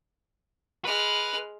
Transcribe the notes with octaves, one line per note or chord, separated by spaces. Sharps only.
G#3 B4 F6